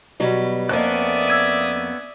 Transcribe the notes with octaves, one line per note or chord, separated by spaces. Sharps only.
B2 F#3 G3
F2 A#3 B3 C#4 D5 E5 D#6 F#6
E6 G#6 D#7